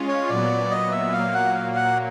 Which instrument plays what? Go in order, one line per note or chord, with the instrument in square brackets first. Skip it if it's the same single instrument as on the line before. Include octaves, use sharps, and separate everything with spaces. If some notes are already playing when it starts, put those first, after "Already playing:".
Already playing: [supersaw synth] G#3 C#4 F4
[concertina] C#5
[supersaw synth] A#2 F#3 B3 [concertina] D5
[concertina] D#5
E5
[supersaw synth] A#2 F#3 A#3 [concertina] F5
[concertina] F#5
F5
F#5